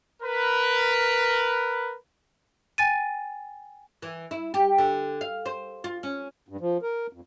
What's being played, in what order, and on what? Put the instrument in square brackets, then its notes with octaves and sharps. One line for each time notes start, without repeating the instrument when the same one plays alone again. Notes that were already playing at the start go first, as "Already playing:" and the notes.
[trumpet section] A#4 B4
[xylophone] G5 G#5 A6 D#7
[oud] E3
E4
G4
D3
F5
C5
F4
C#4
[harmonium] G2
F3
A#4
F2